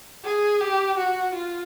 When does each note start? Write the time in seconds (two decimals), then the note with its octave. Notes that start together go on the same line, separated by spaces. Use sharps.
0.24 G#4
0.60 G4
0.97 F#4
1.34 F4